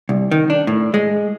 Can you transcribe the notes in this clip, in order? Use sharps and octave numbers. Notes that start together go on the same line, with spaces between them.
C2
D#3
D4
A2
G#3